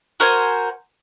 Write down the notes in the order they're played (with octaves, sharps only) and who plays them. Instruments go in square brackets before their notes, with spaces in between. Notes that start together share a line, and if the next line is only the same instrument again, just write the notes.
[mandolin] F#4 A#4 C5 G#5